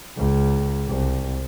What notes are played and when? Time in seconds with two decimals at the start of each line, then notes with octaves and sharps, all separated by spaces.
0.16 C#2
0.87 C2